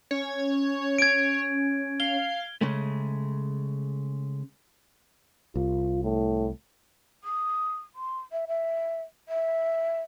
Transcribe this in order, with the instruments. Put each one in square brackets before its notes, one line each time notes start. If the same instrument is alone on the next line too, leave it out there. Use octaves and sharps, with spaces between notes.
[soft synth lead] C#4 [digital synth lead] C#5
[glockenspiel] G#6 D7
[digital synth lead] F5 [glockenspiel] G7
[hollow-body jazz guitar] C#3 G#3 A3
[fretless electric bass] C2 [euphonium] F4
[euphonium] A2
[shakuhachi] D#6
C6
E5
E5
E5